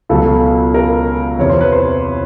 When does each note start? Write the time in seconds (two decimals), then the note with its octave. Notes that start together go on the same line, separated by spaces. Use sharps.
0.09 C#2 B2 F#3 A4
0.74 A#4
1.38 E2 C3 E3 C#5
1.49 C5
1.61 B4
1.72 C5